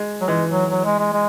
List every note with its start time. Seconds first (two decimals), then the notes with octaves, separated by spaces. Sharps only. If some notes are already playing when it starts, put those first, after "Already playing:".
Already playing: G#3
0.21 F#3
0.28 E3 G#3
0.50 F#3
0.71 F#3
0.85 G#3
0.99 G#3
1.13 G#3